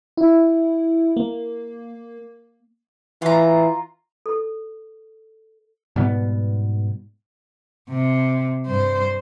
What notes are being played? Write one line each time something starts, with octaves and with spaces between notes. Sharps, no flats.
E4
A#3
E3 F4 A#5
A4
G#2 B2 G3 B3
C3
G2 C5